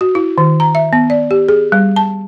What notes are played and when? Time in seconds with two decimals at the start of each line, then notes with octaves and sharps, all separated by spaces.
0.01 F#4
0.15 E4
0.38 D#3
0.60 A#5
0.75 E5
0.93 B3
1.10 D5
1.31 G4
1.49 G#4
1.72 G3
1.96 A5